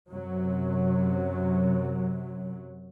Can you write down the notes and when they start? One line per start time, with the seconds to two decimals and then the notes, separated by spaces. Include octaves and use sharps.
0.10 F#2 C3 F#3